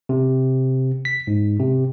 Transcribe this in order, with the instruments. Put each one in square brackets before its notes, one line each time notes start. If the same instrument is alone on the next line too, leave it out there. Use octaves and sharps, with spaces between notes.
[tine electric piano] C3
B6
G#2
C3